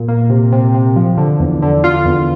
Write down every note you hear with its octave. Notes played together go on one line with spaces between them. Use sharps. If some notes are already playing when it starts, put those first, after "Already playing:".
Already playing: A#2
A#3
C3
C3
C3
F3
D3
E2
D3
F4
E2